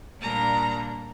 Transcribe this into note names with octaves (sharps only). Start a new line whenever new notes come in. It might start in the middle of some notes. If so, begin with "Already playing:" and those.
A#2 G3 A#3 D4 A#5